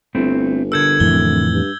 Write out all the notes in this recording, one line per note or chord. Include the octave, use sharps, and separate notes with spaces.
G1 A3 C4 E4
D3 A4 A#4 E6 G6 G#6
D1 F2 A2 E3 G7
G2